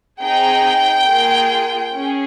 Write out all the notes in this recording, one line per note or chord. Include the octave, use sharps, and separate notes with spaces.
C4 D#4 G#4 G5
A#3 F4 G#4
C#4 G#4